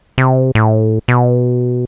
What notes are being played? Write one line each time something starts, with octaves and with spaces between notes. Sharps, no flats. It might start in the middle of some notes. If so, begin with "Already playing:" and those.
C3
A2
B2